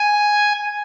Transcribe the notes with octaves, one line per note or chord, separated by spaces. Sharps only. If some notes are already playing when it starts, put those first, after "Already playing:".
Already playing: G#5